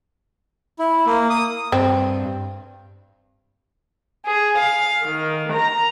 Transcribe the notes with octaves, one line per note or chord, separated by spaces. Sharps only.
E4
A#3
D#6
G2 C4
G#4
F5
D#3
A#5